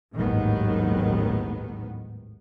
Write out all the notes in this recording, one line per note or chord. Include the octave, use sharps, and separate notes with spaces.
A1 D#2 G#2 D#3 F#3 B3